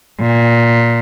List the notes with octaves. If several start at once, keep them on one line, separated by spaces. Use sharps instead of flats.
A#2